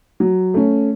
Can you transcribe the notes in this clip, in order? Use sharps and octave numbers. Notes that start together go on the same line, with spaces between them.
F#3
A3 C#4